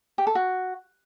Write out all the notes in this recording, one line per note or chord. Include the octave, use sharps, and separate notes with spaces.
G4
A4
F#4